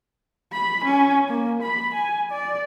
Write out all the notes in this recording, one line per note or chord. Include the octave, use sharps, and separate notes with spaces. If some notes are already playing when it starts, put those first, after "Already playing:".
B5
C#4
A#3
B5
G#5
D5